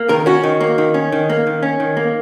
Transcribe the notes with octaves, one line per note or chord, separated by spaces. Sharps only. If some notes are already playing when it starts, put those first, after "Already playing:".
Already playing: A#3
D#3 A#4
C#4 F#4
D#3
A#3
D#3
C#4
D#3
A#3
D#3
C#4
D#3
A#3